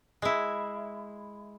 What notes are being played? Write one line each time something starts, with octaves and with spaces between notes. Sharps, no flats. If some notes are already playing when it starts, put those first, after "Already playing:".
G#3 E4